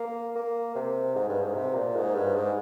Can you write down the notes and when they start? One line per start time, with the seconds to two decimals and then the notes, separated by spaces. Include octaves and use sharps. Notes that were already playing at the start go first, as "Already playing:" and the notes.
Already playing: A#3
0.35 A#3
0.75 C3
1.15 G#2
1.29 G2
1.41 G#2
1.55 C3
1.74 A#2
1.96 G#2
2.15 G2
2.35 G#2